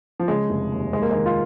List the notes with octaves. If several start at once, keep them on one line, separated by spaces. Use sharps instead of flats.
F3
C#3 G#3
F1
D#2
D#2 G#3
A#3
D#3 G#3
F4